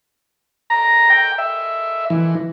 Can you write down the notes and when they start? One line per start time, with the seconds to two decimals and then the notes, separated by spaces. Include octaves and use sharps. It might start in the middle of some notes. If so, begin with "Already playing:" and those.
0.70 A#5
1.10 G5
1.38 E5
2.10 E3